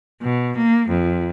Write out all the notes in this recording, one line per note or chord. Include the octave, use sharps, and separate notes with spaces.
B2
A#3
F2